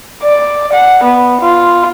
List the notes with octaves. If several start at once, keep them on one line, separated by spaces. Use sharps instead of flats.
D5
F#5
B3
F4